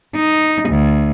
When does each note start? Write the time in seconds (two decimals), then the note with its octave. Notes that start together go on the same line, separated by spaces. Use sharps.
0.16 D#4
0.69 D2